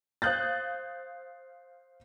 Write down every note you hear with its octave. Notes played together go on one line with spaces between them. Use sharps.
C5 F5 D#6 F#6 G6 A6